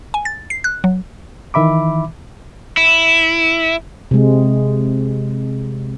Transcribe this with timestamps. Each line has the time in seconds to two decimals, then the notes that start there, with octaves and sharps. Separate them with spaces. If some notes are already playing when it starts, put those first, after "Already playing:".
0.14 G#5
0.25 A6
0.50 C7
0.64 F#6
0.84 F#3
1.54 D#3 E3 E5 B5 D6
2.77 E4
4.11 C3 G#3